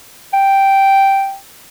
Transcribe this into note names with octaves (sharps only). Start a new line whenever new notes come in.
G5